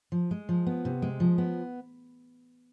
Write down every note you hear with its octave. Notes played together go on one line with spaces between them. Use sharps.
F3
G#3
F3
B3
C3
G#3
F3
B3